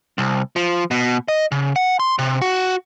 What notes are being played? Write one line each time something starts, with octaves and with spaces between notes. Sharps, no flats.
C2
F3
B2
D#5
C#3
F#5
C6
C3
F#4